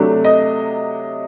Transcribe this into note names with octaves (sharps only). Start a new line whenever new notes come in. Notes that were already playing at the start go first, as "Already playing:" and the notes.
Already playing: C3 F#3 A3 D4
D#5